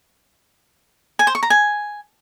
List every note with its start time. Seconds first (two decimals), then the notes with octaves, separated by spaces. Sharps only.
1.19 G#5
1.27 C5
1.35 C#6
1.43 A#5
1.50 G#5